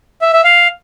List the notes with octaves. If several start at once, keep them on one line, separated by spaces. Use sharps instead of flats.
E5
E5
F5